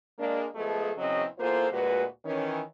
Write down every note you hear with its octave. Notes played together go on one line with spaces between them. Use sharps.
G#3 A#3 D4
F3 G#3 A3 B3 G#4 A4
E2 C#3 F#3 C4 D#5
E2 A#3 F4 A4 C5
D2 A#2 G#3 F#4 B4
D#3 E3 C#4